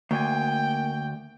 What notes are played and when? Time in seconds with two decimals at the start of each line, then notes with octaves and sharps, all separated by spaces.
0.11 D2 A#3 G5 G#5